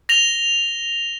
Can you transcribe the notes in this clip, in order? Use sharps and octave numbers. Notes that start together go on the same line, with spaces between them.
A#6 F7 G7